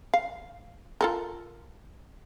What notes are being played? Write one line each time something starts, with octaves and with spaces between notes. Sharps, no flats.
F5
F4 A4 A#4